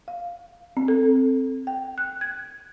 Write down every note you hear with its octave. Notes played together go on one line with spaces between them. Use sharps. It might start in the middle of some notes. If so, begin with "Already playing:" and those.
F5
C4
A4
G5
F#6
G#6